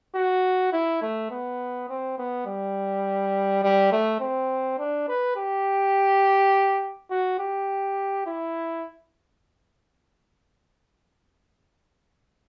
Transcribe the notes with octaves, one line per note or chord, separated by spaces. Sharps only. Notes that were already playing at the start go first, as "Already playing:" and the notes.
F#4
E4
A3
B3
C4
B3
G3
G3
A3
C4
D4
B4
G4
F#4
G4
E4